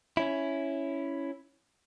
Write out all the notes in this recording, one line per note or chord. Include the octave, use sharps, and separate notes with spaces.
C#4 E4